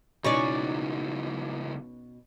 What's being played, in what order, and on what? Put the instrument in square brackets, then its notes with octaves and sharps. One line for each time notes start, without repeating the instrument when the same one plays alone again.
[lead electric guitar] C#2 E3 [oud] B2 C#4 D#4 [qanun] D5 C#6